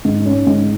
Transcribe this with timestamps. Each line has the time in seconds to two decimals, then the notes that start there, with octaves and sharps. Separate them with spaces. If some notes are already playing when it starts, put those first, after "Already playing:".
0.05 G#2
0.25 C#4
0.47 G#2